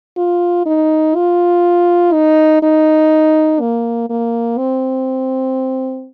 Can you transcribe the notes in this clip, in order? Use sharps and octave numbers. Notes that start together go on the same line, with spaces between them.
F4
D#4
F4
D#4
D#4
A#3
A#3
C4